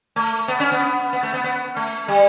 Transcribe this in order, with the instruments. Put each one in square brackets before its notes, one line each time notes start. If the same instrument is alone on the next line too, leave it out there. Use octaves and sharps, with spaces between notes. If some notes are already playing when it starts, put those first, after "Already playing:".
[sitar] A3
B3
C#4
B3
B3
A3
B3
B3
A3
G3